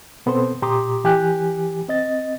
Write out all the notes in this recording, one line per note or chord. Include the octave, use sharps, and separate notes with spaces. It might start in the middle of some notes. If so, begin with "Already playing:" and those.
B2 B3 C4 A4 C5 C6
A#2 G4 A#5 C6 D6 D#6
E3 G4 G#5 F#6
C4 D#5 A6